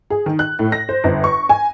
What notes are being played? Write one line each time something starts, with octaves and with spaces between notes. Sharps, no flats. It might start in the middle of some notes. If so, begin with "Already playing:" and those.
G#4
D#3
F#6
A2
A#6
C5
G1
C#6
G#5